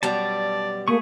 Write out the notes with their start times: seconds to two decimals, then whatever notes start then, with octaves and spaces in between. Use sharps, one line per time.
0.03 F#2 B2 G3 D5 A5
0.88 A3 A#3 G#4 C#6